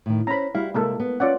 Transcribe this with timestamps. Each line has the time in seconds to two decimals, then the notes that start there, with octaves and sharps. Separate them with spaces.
0.06 A2 D#3
0.27 C#4 C5 A#5 B5
0.55 G3 E4 F#4 F5
0.74 C3 G#3 A#3 E4 A4
1.00 B3
1.20 C#4 F4 D5 F#5